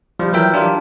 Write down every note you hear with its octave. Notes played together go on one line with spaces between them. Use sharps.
F3 G3
E3 F#3 A#4 E5 G5
D4 F4 G4 A#4